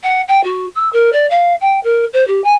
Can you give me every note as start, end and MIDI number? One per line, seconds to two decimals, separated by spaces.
0.04 0.22 78
0.28 0.43 79
0.44 0.66 66
0.75 0.89 88
0.93 1.10 70
1.13 1.26 74
1.31 1.54 77
1.61 1.80 79
1.84 2.05 70
2.13 2.26 72
2.28 2.41 67
2.44 2.54 80